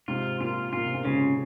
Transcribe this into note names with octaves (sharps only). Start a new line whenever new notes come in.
G#2 C3 F4
A#2 F4
A#2 F4
C3
A#2
G#2 C#3